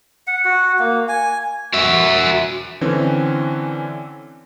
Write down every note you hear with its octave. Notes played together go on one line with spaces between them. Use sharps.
F#5
F#4
A#3
G#5
F#4 E5
D3 E3 C4 C#4